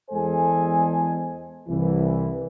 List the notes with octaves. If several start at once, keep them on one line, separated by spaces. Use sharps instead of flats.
E2 G#3 A4 C5 D#5 G#5
C2 E3